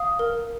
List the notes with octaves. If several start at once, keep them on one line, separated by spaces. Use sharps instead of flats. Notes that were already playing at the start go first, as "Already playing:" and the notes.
Already playing: F5 D#6
A#4